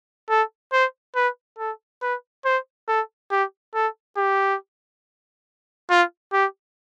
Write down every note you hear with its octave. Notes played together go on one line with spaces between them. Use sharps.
A4
C5
B4
A4
B4
C5
A4
G4
A4
G4
F4
G4